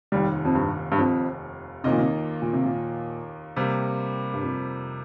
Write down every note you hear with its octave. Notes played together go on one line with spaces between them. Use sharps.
F1 D#2 D#3 G3
F2
G2
G2
F2
D#2 C3 D#3 A#3 F4 D#5
A#2
C3
A#2
C3
A#2
C3 G3 A#3
G2
F2